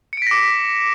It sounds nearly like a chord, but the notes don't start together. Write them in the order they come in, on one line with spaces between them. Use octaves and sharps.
C#7 D7 B6 A#6 D6